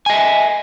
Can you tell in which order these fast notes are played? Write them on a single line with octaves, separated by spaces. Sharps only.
G#5 D#5 E5